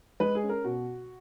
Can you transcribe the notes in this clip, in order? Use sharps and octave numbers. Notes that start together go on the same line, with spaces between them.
G#3 B4
G#4
C#4
A#4
B2 F#4